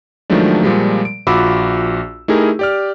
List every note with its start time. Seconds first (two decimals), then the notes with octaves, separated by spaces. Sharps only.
0.30 D#3 F3 F#3 G#3 A3 D4
0.63 A#2 F3 G3 G#3
1.05 D7
1.27 A#1 F4 F#4 B5 D6 E6
2.28 A3 D#4 E4 G4 G#4 A#4
2.59 G4 D5 F6